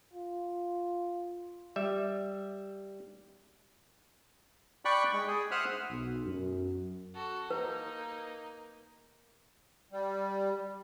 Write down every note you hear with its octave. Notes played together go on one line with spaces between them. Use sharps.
F4
G3 E5
D5 G5 B5 C#6 F#6
G#3 G5
G#4
C5 E5 F#5 D#6 F6 F#6
B1
F#2
F#4 A4
A#3 D#4 B4
G3